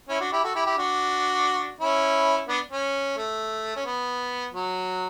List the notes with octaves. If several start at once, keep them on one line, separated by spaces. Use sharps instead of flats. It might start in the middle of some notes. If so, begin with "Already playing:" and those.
C#4 E4
D4 F#4
E4 G4
F#4 A4
E4 G4
E4 G4
D4 F#4
C#4 E4
B3 D4
C#4
A3
C#4
B3
F#3